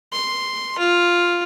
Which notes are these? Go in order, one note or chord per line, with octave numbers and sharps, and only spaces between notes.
C6
F4